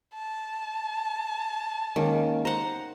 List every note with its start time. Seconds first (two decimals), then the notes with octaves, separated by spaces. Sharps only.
0.14 A5
1.96 D#3 G#3 A#3 C#4
2.45 C5 F#5 A#5